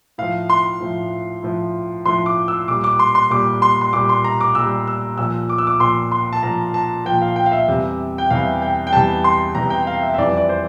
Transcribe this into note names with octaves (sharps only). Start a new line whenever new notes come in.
A2 F3 F5
C6
A2 F3
A2 F3
A2 F3 C6
D6
E6
A#2 G3 D6
D6
C6
C6
A#2 G3 D6
C6
C6
A#2 G3 D6
C6
A#5
D6
A#2 G3 E6
E6
A#2 F3 E6
D6
E6
D6
A#2 F3 C6
C6
A5
A#2 F3 A#5
A5
A#2 F3 G5
F5
G5
F5
E5
E2 C3 G3
G5
E2 C3 G3 F5
G5
G5
E2 C3 G3 A5
C6
E2 C3 G3 A#5
G5
F5
E5
E5
F2 E3 G3 D5
D5
C5